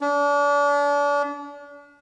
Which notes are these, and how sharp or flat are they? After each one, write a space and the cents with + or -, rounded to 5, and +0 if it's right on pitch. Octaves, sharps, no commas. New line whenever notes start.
D4 -35